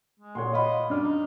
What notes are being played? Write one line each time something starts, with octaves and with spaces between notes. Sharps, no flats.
G#3
A#2 C#5 F#5 C6
D#5 F5 B5
F#2 G3 D4 F6
D#4